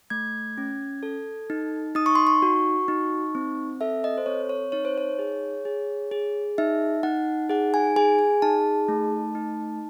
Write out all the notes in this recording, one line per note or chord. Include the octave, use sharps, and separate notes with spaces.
A3 G#6
C#4
A4
D#4
D#4 D#6
C#6
C6
C#6
F#4
D#4
C4
A4 E5
D#5
C5
C4 C#5
C#5
D#4 C#5
C5
C#5
G#4
G#4
G#4
D#4 E5
D#4 F#5
G#4 F#5
G#5
G#4 G#5
G#5
D#4 A5
A3
D#4